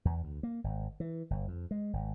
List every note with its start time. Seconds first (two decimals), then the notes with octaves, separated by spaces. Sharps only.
0.05 E2
0.23 D2
0.43 A#3
0.64 G#1
1.00 E3
1.30 G1
1.48 F2
1.71 G#3
1.93 G#1